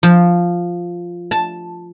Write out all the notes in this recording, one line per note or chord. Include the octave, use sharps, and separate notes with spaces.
F3
A5